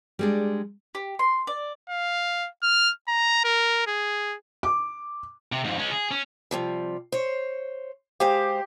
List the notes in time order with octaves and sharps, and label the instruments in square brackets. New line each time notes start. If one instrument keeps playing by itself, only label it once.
[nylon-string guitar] G3 G#3 D4
[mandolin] G4
C6
D5
[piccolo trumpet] F5
F6
A#5
A#4
G#4
[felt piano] D6
[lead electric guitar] C3
F2 G#2
G#3 C#4
G#4
C#4
[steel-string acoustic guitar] C3 F3 G3
C5 C#5
[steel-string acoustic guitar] G#3 C5 F5 [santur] G4